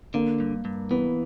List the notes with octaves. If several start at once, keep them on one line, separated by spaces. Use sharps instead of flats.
D3 A#3
G2
G2
E3 B3